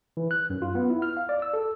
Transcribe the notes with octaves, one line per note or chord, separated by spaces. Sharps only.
E3
F#6
F#2
F4
B3
E4
F6
F5
D5
E6
A4